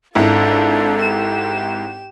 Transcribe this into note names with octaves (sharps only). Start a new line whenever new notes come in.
G#1 G#2 D4 E4 F4 A4
G4 E7